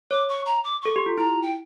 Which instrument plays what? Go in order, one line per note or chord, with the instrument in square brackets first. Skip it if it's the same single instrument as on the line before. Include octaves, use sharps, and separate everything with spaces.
[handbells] C#5 [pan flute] D6
[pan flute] C#6
A#5
D6
[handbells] A4 [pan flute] C#6
[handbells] G4
F4
[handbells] E4 [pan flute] A#5
[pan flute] G5